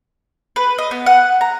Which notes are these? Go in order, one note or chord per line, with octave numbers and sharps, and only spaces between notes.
B4
D#5
B3
F#5
A#5